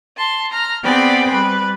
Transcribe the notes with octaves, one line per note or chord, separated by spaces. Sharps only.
A5 C6
A#5 F6
B3 C4 G#4 D5 G5 B5
G3 B4